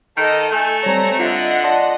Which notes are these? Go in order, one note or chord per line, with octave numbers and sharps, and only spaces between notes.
D#3 A4 D#5
A3 G#5
G3 C4 C#5 A#5
D3 F4 D#5 E5 F#5
D5 A5 C6